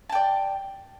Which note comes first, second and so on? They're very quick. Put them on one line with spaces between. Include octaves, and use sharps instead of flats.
A5 G5 D5